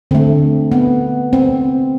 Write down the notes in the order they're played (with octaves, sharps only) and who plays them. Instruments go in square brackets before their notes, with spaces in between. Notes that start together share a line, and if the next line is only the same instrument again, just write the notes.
[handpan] D3 A3 C4
B3
C4